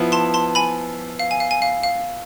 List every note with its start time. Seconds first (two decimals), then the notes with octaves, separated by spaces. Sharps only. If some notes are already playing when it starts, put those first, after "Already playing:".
Already playing: F3 B3 E4
0.12 A5 C6
0.34 A5 C6
0.55 G#5 B5
1.19 F5
1.31 G#5
1.40 F5
1.51 G#5
1.62 F5
1.83 F5